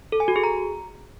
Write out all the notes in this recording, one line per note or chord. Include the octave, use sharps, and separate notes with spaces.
A4
G#5
F#4
G#4
A#5